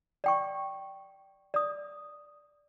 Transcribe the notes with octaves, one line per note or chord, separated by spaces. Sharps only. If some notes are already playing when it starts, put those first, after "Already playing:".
D5 G5 C#6
D5 D#6